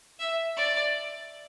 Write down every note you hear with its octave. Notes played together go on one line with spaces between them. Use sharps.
E5
D5